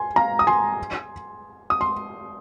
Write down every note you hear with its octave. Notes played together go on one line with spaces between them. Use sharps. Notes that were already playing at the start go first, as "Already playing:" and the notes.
Already playing: G#5 C6
F5 A#5
D#6
G#5 C6
D#6
C6